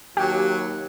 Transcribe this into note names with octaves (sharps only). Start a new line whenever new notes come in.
D#2 F#3 G4